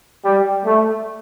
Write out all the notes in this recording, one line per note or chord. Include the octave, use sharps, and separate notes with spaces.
G3
A3